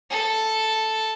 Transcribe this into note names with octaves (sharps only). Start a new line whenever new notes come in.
A4